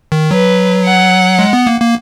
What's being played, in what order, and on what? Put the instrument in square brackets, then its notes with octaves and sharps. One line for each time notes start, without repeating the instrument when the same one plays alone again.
[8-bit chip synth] D#3
[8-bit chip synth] F#3 [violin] B4
[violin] F#5
[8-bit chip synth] G#3
B3
A#3
A#3